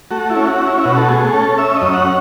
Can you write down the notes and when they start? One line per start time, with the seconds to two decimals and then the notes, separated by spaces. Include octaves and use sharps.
0.11 A3 F#4
0.30 E4
0.35 C#4
0.47 F#4
0.60 C#4
0.67 E4
0.77 E4
0.84 B2 F#4
0.96 A4
1.09 A3 G#4
1.33 C#4 A4
1.58 C#4 E5
1.76 D#5
1.82 F#2
1.94 F#5